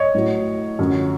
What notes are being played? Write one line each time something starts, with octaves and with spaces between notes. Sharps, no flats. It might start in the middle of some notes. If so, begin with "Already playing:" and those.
Already playing: C#5 D#5
A2 F#3
F#2 D3 F3